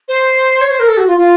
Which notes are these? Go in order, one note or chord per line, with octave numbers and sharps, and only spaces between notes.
C5
C#5
C5
A#4
A4
F#4
F4
F4